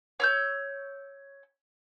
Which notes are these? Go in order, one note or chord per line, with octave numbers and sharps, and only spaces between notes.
C#5 E6 G6